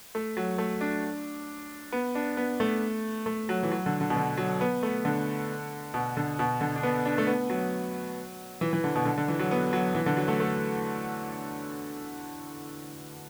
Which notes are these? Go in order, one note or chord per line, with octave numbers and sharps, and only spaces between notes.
A3
F#3
A3
D4
B3
D4
B3
A3
A3
F#3
E3
F#3
D3
D3
B2
D3
F#3
B3
A3
D3
B2
D3
B2
D3
D4
B3
D4
A3
B3
F#3
E3
E3
D3
B2
D3
D3
E3
F#3
B3
F#3
E3
D3
F#3
A3
A3